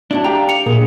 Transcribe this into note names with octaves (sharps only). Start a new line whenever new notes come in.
D4 E4 F#4 A5
G4 F5 G5 A#5
C#7 F7
A#2 G#4